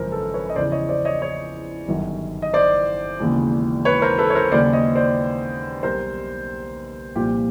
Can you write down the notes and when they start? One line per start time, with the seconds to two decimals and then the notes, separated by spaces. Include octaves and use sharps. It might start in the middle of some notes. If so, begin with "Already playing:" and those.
Already playing: G#1 F#2 C#3 F3 A#4 C5
0.12 A4 B4
0.34 B4 C#5
0.50 D#5
0.56 E2 C#3 F3 C5 D5
0.72 C#5 D#5
0.89 C5 D5
1.05 C#5 D#5
1.22 C#5 D#5
1.88 G1 F#2 D#3 F#3
2.42 D#5
2.53 C5 D5
3.20 E1 D#2 C#3
3.85 B4 C#5
4.02 A#4 C5
4.18 A4 B4
4.30 C#5
4.35 A#4 C5
4.52 D#2 C#3 F#3 C5 D5
4.73 C#5 D#5
4.95 C5 D5
5.83 B1 B2 G3 A#4 C5
7.16 C2 A#2 F3 F4 G4